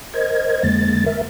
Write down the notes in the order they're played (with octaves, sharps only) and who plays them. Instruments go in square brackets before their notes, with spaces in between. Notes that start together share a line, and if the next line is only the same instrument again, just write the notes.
[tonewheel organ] A#4 C5 D#5 G#6
F2 D3 G#3 A#3 A6
A#4 E5